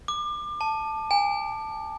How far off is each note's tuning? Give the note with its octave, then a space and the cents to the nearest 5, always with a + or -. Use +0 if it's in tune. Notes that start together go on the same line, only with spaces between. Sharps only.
D6 +30
A5 +0
G#5 -35